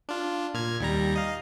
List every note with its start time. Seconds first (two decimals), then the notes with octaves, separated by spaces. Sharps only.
0.09 D4 F4
0.54 A#2 F6 G#6
0.80 D#2 G3 A#5
1.16 D#5 F5